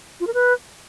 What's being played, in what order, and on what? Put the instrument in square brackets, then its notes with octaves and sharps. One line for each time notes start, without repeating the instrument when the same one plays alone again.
[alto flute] F4
A#4
B4